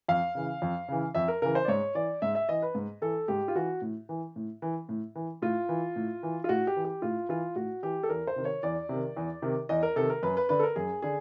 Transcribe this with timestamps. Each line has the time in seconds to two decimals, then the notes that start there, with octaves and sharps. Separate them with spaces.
0.08 F2 F5
0.35 C#3 E3
0.62 F2
0.88 C#3 E3
1.15 F2 E5
1.28 A#4
1.42 C#3 E3 A#4
1.55 C5
1.65 D5
1.68 G#2 C#5
1.95 E3 D5
2.22 G#2 E5
2.35 E5
2.49 E3 D#5
2.62 B4
2.75 G#2
3.02 E3 A4
3.28 G#2 G4
3.48 F4
3.55 E3 F#4
3.81 A2
4.09 E3
4.36 A2
4.62 E3
4.89 A2
5.15 E3
5.42 A2 F4
5.69 E3
5.96 A2
6.23 E3
6.44 F4
6.49 A2 F#4
6.67 G4
6.76 E3
6.85 G4
7.02 A2 F4
7.29 E3 F4
7.56 A2 F#4
7.83 E3 G4
8.03 A4
8.09 E2 A#4
8.27 C5
8.36 C3 D#3
8.45 C#5
8.63 E2 D5
8.89 C3 D#3
9.17 E2
9.42 C3 D#3
9.69 E2 D#5
9.83 A#4
9.96 C3 D#3 A4
10.10 A#4
10.23 F#2 B4
10.37 B4
10.49 D3 B4
10.59 A4
10.63 A#4
10.76 F#2 G#4
11.02 D3 G#4